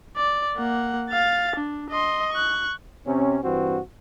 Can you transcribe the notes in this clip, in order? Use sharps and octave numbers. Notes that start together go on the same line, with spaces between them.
D5
A#3 F#5
F5 A6
D4
D#5 C6
C#6 F#6
C3 C4 C#4
G2 E3 C4 F#4